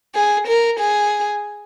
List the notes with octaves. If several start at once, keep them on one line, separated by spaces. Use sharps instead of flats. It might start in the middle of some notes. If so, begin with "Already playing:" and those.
G#4
A#4
G#4